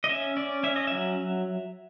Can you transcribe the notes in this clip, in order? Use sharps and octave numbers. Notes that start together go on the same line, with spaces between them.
D#5
C#4 E5
C#4 D5
C#4 E5
D#5
F#3 E5